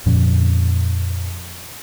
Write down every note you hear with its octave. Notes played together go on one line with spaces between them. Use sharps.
F2 A#2 F3 C#4